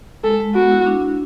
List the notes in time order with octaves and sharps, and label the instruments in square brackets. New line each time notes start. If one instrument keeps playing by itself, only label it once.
[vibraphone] G#3 [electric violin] A4
[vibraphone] G#3
[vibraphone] B3 [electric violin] F#4
[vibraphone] E4
D4
D4